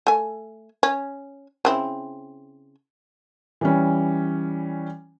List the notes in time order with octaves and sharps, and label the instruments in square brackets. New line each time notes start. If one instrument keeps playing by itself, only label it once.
[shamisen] A3 G#5
C#4
C#3 C4 E4
[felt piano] E3 G3 C#4